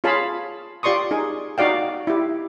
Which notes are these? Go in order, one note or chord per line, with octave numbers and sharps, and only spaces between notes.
F4 G#4 C#5 F5 A5 B5
F4 G4 D5 C6 C#6 D#6
D#4 G#4
D#4 F#4 D5 F5 G5
E4 G4